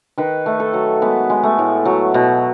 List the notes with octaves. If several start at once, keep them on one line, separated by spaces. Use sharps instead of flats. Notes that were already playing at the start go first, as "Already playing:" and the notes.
D#3 B4
A3
A4
F#3
G#3 B3
G#3
A3
A2
F#3
B2